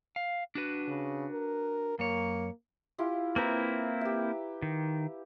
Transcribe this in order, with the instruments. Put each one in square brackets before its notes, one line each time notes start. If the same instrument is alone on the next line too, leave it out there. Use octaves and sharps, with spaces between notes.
[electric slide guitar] F5
D4 F#4 B4
[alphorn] C#3
A#4
[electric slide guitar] F#2 C#5 [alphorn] A#3
[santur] E4 F4 G4
[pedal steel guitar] A#3 C4 E4 [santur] B4 A#5
[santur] G4 E5
[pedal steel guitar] D#3